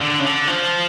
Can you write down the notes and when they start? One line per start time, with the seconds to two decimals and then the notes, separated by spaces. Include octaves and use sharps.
0.02 D3
0.20 C#3
0.25 D3
0.48 F3